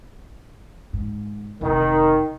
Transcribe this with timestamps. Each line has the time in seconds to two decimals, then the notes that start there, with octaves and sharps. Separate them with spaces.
0.93 G#2
1.61 F1 D#3